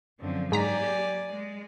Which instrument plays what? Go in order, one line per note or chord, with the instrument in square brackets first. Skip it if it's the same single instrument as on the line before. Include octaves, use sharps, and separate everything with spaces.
[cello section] F#2 D3 F3 [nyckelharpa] C4
[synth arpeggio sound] G#2 A#5 B6 [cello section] F#3 A#3 G4 [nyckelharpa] D5 G#5
[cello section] G#3